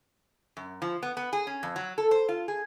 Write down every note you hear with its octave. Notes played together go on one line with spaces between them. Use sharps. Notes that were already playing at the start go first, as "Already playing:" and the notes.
F#2
F3
B3
B3
G#4
C#4
F2
F#3
A4
C5
F4
G#4